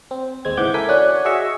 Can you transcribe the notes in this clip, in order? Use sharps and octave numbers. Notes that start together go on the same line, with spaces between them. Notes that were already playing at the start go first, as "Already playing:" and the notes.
C4
D#2 G#3 C4 G#6
G#2 C#3 E3 F#5 D6 G6
E4 A4 A#4 G#5 B6
C#4 D4 F#4 D5 F#5 G#5
F#4 G#4 D#5 E5 C#6 E6